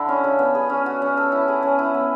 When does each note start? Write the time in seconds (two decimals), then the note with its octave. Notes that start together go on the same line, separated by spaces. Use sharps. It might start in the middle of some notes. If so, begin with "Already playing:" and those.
Already playing: D3 E4 A4
0.09 C#4
0.24 C#3
0.39 B3
0.55 G#4
0.70 C#4
0.86 F#4
1.02 C#4
1.17 A4
1.32 E4
1.48 G#4
1.63 C#4
1.79 E4
1.94 B3